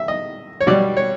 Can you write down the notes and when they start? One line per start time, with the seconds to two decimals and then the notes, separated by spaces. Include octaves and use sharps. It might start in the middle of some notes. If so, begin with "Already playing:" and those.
Already playing: E5
0.08 D#5
0.61 C#5
0.67 B2 G3 D5
0.97 C#5